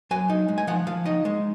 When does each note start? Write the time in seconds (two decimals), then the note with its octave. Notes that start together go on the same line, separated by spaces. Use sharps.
0.11 F#3 G#5
0.30 D#4
0.48 G#3
0.58 G#5
0.67 F3 F#5
0.87 F3 F5
1.06 D#4 D#5
1.25 G#3